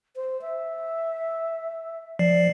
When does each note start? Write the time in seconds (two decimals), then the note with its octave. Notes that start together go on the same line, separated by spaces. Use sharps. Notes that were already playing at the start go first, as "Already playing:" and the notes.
0.16 C5
0.42 E5
2.19 F3 D5 C7